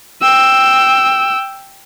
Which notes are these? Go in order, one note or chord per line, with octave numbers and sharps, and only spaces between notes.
G5 E6